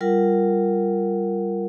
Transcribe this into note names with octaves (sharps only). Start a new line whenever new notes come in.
G3 F4 A#4 F#5